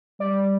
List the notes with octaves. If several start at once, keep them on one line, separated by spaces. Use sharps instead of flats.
G3 D5